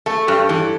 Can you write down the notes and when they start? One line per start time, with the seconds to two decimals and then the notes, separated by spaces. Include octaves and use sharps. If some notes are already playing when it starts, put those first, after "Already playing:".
0.06 A3 A4
0.27 G2 G4
0.49 E3 A4